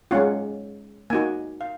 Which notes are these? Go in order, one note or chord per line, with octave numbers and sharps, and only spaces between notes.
G#3 C#4 F4 F#5
A#3 D#4 F#4 G#5
F5